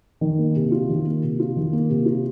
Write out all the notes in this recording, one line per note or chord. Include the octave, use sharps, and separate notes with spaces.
D#3
A#3
C3
F4
D#3
A#3
C3
F4
D#3
A#3
C3
F4